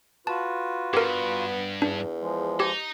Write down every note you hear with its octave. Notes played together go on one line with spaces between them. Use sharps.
F4 F#4 B4 A5
G2 B3 G4 A#4
E2 D4
F3 G#3
D#4 G4